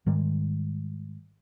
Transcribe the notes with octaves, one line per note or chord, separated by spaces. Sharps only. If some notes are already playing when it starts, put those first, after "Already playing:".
G#2 D#3 G3 G#3